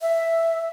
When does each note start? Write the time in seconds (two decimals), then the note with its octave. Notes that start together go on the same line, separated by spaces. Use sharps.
0.01 E5